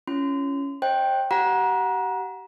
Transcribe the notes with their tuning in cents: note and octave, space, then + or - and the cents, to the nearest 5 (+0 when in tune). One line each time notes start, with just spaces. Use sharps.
C#4 +0 E4 +45 C6 -35
C5 +40 D#5 +0 G5 +0
G4 -35 F#5 -15 A#5 +30